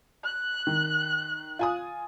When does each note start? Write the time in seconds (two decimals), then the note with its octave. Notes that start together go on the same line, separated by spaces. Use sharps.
0.24 F#6
0.67 D#3
1.59 F4 G#5 D#6